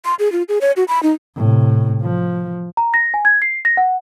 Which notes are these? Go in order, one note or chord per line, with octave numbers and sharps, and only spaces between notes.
C6
G#4
F4
G#4
C#5
F#4
B5
D#4
A2 C3
F3
A#5
A#6
G#5
G#6
C7
A#6
F#5